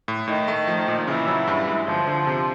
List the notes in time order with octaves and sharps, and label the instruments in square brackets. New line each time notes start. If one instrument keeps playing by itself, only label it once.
[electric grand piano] A2
[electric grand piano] A2 [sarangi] D#3
[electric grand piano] A3
F3
A#2
[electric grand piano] C#3 [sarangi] E3
[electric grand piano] F#3
G2
G#3
[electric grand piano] G1 [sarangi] F3
[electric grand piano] D3
C3